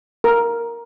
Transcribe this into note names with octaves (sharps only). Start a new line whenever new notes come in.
A#4